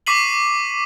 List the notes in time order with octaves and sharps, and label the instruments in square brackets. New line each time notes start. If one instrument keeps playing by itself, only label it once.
[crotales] C#6 D6 B6 C7 D#7 F#7